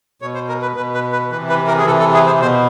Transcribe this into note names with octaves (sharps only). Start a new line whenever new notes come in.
B2 C#5
C5
A#4
B4
B2 B4
B4
B4
C3 E3 B4
B4
A#4
G#4
C3 E3 A4
A4
G#4
C5
B2 C5